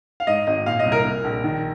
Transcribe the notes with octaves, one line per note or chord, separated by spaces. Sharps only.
F5
G#2 D#5
G#1 D#5
A#2 F5
D#5
C2
A#4
A#2
A#1
D#3